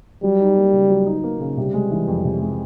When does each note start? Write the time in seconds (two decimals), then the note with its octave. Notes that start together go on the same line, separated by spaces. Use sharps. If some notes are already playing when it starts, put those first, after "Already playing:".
0.23 F#3 G3
0.40 D#4
0.56 A#3
0.73 C#3
0.90 F#3
1.07 D#4
1.24 A#3
1.40 C#3
1.57 C3 G3
1.74 G#3
1.91 E3
2.07 F2
2.24 C3
2.41 G#3